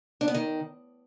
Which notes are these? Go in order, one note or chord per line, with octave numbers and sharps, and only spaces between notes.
D4
B3
D#3